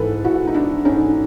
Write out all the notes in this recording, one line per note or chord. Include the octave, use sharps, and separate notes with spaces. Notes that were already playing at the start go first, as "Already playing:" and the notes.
Already playing: G#2 E3 A4 B4
E4 F#4
D#4
D4 E4
C#4 D#4